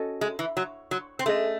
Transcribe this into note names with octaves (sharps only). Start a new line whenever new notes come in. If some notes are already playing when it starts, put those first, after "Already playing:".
Already playing: C#4 F#4 A4 D#5
G#3
E3
F#3
F#3
C4
A3 C#4 G#4 D#5